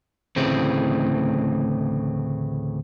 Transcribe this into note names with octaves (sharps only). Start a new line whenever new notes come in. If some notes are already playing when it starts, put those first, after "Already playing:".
D2 A2 C#3 E3 C4